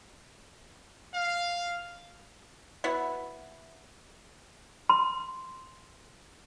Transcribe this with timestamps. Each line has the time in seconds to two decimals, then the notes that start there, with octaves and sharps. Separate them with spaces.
1.14 F5
2.84 B3 E4 F#4
4.89 C6